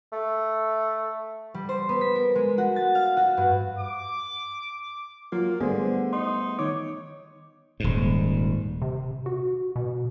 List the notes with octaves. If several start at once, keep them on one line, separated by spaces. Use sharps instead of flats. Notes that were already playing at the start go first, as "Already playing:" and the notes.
A3
G3
C5
B3
B6
A#4
G#3
F#4
A6
F5
F#4
G2
D6
F#3 A#3 F4
D3 G3 A3 B3 G#4 C5
D#4 C6
D#3 D#4 C#5 D6
D#1 G#2
C3
F#4
B2